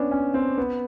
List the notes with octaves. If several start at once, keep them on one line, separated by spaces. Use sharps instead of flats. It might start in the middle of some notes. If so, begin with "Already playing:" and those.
Already playing: B3 C#4 D4
C#4
C4
B3